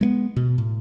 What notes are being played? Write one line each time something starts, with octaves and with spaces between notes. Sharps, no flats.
G#3 A3 B3
B2
A2